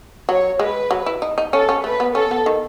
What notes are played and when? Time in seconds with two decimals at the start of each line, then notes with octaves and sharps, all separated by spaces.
0.29 F#3 C#5
0.59 G#3 B4
0.91 F#3
1.06 E4
1.22 D#4
1.38 D#4
1.53 C#4 A4
1.69 C#4
1.84 A3 B4
2.00 B3
2.15 C#4 A4
2.31 B3
2.46 D#3